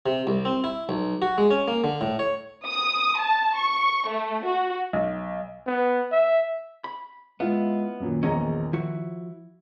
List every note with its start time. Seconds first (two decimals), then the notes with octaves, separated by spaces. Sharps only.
0.06 C3
0.27 C2
0.45 C4
0.64 E4
0.89 B1
1.22 F#4
1.38 G#3
1.51 C#4
1.68 A#3
1.84 D3
2.01 A2
2.19 C#5
2.67 D#6
3.20 A5
3.57 C#6
4.09 A3
4.45 F#4
4.93 B1
5.66 B3
6.12 E5
6.84 B5
7.40 G#3 B3 E4 F4 F5
8.00 F#2 A#2 D#3
8.23 A#1 E2 C#4 D#5 A#5
8.73 F3 E4 F#4